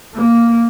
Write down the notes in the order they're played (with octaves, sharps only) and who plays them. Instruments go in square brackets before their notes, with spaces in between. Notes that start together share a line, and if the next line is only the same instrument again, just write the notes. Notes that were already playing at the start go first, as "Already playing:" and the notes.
[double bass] A#3